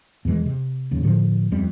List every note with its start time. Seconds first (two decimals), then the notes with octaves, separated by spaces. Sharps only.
0.25 E2 B2 E3 G#3
0.46 C3
0.91 D1 D#2 C#3
1.03 A2 D3 F3 D4
1.51 D#1 F2 G3 C4